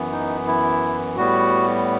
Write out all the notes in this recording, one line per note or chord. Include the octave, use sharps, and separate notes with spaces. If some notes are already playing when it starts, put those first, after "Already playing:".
Already playing: F#2 E3 B3
D#4
E4
A2 G3 B3 F#4